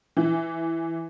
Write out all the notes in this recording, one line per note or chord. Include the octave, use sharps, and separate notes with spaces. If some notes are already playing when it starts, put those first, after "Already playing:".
E3